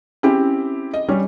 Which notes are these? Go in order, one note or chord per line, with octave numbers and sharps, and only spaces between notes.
C4 C#4 E4 G4
D#5
G3 C#4